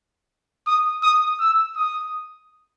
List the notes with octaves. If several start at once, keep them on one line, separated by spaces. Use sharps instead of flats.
D#6
D#6
E6
D#6